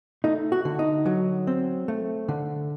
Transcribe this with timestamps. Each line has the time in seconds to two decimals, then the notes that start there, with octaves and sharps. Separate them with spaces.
0.24 A3 D#4
0.52 F#4
0.65 D3
0.79 D#4
1.06 F#3
1.47 C4
1.88 A3
2.28 D3